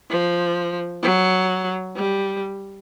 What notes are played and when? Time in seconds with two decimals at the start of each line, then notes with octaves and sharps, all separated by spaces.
0.10 F3
1.03 F#3
1.96 G3